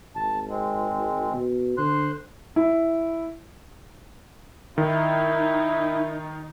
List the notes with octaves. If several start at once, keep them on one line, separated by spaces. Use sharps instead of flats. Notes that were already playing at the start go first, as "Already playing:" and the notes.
G#1 A5
G#3 C4
B2
D3 C5 C6 F#6
E4
D#3 D#4 E4